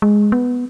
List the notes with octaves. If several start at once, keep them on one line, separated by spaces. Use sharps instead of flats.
G#3
B3